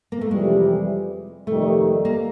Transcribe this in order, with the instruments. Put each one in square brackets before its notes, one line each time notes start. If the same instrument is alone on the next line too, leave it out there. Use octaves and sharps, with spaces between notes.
[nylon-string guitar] A#3
A3
[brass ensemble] F2 C3 E3 G3 [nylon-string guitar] G#3
[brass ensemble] F2 C3 D#3 G3 [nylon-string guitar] A3
[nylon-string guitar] A#3